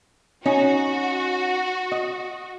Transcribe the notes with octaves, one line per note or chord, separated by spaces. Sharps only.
C#4 D#4 F#4
D#5